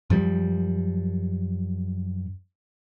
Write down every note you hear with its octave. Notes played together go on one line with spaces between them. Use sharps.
F#2 F3 G3